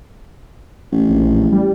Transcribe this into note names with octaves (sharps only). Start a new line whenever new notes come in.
A1
A#1
G3